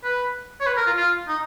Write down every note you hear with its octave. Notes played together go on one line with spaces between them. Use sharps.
B4
C#5
B4
A#4
F4
F4
D#4